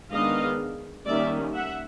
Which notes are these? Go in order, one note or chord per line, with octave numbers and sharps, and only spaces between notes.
D#3 G#3 B3 D4 D#5 F5
D#3 G3 A#3 C#4 D5 E5
E5 F#5